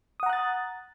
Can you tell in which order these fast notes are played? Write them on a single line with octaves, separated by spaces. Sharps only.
D#6 F#5 A#5 F#6 A6